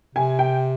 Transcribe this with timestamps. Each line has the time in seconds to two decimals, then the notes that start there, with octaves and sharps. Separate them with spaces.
0.15 C3 G#5
0.39 G5